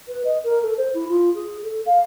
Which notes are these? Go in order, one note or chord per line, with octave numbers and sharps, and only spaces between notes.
B4
D#5
A#4
A4
C5
E4
F4
G#4
A4
F5